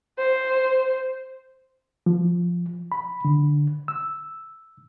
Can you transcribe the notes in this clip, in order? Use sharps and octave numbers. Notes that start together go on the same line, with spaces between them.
C5
F3
B5
D3
E6